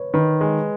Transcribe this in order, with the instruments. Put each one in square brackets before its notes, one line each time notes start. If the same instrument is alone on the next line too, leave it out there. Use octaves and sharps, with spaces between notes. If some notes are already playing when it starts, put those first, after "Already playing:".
Already playing: [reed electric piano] B4 C#5
[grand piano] D#3 [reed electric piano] B4
[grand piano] G#3